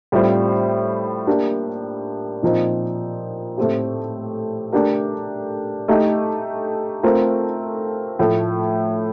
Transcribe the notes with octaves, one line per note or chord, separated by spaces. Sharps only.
A2 G3 C4 F4 C5
A#3 D4 G4
A#2 F3 C4 D#4
A2 A3 C4 G4
A3 D4 G4 A#4
A3 D#4 G4
A3 C4 F4 A#4
A2 F3 A3